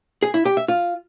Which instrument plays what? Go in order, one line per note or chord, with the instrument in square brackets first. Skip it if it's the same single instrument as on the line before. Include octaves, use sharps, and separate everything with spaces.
[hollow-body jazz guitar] G#4
E4
G4
E5
F4